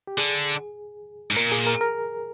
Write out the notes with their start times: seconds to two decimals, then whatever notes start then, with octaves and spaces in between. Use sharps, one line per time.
0.07 G4
0.18 D3 G#4
1.31 G#2
1.36 A#2 A#4
1.52 G#4
1.67 A#4
1.81 A#4